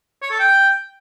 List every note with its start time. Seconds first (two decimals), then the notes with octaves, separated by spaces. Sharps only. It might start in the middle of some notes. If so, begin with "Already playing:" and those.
0.22 C#5
0.30 A4
0.39 G5